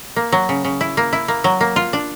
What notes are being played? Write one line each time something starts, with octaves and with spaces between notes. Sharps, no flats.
A#3
F#3
C#3
C#3
E4
A#3
E4
A#3
F#3
A#3
F4
D4